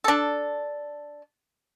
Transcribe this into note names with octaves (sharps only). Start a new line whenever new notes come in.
D4 A4